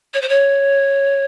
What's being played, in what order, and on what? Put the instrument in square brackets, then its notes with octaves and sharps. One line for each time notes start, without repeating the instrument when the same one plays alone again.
[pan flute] C#5
C5
C#5